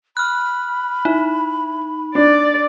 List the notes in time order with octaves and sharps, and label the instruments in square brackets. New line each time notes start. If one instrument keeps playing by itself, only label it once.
[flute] B5 [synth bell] F6 F#6
[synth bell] D#4 [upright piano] E4
[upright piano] D4 [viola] D5